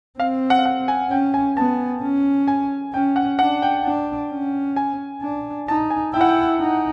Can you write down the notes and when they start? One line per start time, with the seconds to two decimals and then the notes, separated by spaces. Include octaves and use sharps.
0.19 C4 F5
0.50 F#5
0.58 F5
0.65 F#5
0.88 G#5
1.10 C#4 G5
1.34 G#5
1.57 B3 A5
2.02 C#4
2.48 G#5
2.94 C#4 G5
3.16 F#5
3.39 D4 F#5
3.62 G5
3.85 D4
4.31 C#4
4.76 G#5
5.22 D4
5.68 D#4 A5
5.90 G#5
6.14 E4 G5
6.21 F#5
6.28 G5
6.60 D#4